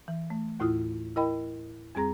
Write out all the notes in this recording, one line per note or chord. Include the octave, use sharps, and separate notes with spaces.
E3
A3
D#2 A2 E4 F4 D#6
E4 A#4 D#5 G5 B5
F2 G3 C4 G#4 A#5 A#6